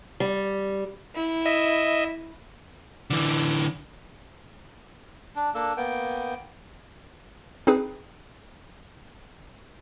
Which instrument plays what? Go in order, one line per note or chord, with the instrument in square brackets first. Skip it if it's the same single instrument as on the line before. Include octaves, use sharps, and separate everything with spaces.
[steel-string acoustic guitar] G3
[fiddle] E4
[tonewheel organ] D#5 E5
[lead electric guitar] D3 E3
[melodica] D4
A#3 D4 A4
A#3 B3 G5
[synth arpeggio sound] C4 D#4 G#4 B4